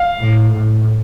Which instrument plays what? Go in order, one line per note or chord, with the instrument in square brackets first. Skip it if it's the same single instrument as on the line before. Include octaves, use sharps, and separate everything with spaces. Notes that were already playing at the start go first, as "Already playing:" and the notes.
Already playing: [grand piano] F5
[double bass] A2
A2